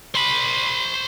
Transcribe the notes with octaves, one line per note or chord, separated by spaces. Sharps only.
C5 B5